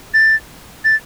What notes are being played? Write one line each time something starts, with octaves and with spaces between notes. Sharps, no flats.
A6
A6